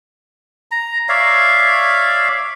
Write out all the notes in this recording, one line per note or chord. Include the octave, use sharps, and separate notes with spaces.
A#5
C#5 D5 E5 F5